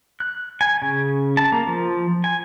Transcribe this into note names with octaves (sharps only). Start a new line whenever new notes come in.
F#6
G#5
C#3
A5
A#3
F3
G#5